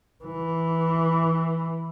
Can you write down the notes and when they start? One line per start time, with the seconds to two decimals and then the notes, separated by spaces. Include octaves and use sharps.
0.25 E3